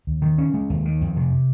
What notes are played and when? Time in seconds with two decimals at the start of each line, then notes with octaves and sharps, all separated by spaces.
0.07 D#2
0.22 D#3
0.38 C#4
0.54 G#3
0.70 D#2
0.85 D#3
1.01 F2
1.17 C3